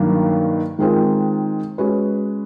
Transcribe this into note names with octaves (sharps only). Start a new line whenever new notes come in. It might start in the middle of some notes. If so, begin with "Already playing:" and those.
Already playing: G2 D#3 F#3 A#3 D4
D#3 G#3 C4 F4 A#4
G#3 C#4 F#4 B4